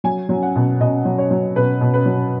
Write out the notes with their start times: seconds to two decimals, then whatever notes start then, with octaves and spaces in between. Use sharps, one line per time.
0.04 F#3 G#5
0.29 F#3
0.43 F#5
0.56 B2
0.80 B2 D#5
1.05 F#3
1.18 C#5
1.31 F#3
1.56 B2 B4
1.81 B2
1.94 B4
2.06 F#3